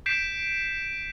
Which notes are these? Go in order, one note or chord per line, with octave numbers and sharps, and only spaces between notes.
G6 B6 C7 D7 E7